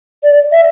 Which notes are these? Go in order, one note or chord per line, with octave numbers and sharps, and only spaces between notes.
D5
E5